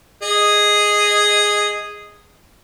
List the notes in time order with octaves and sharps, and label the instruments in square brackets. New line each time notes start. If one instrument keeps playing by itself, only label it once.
[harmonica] G#4 D#5